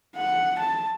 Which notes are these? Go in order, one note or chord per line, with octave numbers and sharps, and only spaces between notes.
F#5
A5